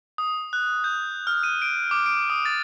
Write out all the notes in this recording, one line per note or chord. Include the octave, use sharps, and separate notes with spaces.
D#6
F#6
G6
F6
D#7
D7
D6
D7
D#6
A6